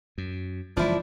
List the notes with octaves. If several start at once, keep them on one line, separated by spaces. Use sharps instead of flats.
F#2
F#1 E3 F3 G#3 D4 E4